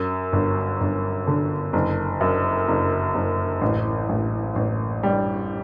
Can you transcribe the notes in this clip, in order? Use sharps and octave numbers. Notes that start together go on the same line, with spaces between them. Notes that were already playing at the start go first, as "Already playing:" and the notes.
Already playing: F#2
G1
G1
D3
F#1
F#2
F#1
F#1
A1
A1
A1
G3